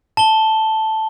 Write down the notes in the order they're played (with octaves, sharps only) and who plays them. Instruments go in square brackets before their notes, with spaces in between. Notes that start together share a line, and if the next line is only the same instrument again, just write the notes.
[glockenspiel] A5 G7